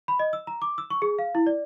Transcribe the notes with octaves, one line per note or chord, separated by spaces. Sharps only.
B5
D#5
E6
A#5
D6
E6
C#6
G#4
F5
E4
D5